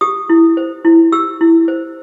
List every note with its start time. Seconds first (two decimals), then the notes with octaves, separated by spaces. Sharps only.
0.01 G4 D#6
0.29 E4
0.57 C5
0.85 E4
1.12 G4 E6
1.41 E4
1.68 C5